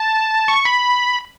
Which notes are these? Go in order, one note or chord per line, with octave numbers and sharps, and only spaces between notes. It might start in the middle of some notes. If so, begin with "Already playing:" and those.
Already playing: A5
C#6
B5